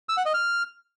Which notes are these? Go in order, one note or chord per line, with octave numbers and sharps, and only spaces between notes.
E6
F#5
D#5
F6